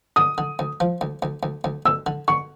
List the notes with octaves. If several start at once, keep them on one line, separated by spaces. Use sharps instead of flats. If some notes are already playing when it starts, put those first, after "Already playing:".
D3 D#6
D3
D2
F3
D2
D2
D2
D2
D2 E6
D3
D3 C#6